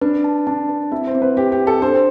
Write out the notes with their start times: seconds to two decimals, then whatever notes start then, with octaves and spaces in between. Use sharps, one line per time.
0.01 D4 B4
0.24 A5
0.47 D4 A5
0.69 B4
0.92 C4 E4
1.07 C5
1.15 C4
1.22 B4
1.37 C4 G4
1.52 G4
1.60 C4
1.67 A4
1.82 D4 C5